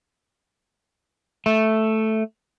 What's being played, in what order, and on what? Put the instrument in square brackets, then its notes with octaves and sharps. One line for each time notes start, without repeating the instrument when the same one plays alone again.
[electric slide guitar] A3